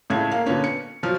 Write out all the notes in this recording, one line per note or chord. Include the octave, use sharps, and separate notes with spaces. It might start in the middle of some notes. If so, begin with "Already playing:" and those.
C#2 A2 A4 G#6
A#3 F5
A#2 D3 B3 C#4
C#7
B2 F3 F#3 F6